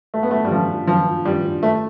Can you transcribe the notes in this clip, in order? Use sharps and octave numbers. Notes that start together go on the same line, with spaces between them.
A3
B3
A3
G3
F3
F3
G3
A3